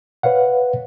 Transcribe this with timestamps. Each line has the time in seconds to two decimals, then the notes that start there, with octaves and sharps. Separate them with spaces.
0.23 B4 C#5 F5 F#5